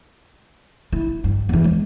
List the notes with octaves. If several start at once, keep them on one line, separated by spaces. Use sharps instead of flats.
E4
G2
E2 E3
G#3